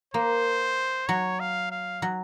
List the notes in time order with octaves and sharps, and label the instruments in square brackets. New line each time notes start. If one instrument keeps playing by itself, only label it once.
[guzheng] A#3 [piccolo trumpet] C5
[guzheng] F#3 [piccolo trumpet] C#5
[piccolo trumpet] F5
F5
[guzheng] F#3